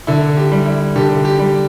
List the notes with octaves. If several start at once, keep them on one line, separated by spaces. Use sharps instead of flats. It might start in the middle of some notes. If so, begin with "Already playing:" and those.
D3 E4
G4
G3
E4
D3 G4
G4
G3